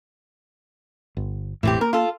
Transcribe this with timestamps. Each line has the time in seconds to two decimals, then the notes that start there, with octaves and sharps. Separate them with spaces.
1.17 G1
1.63 E1 A1 A2 E3 C4 G4
1.81 A#3 A#4
1.93 F4 A4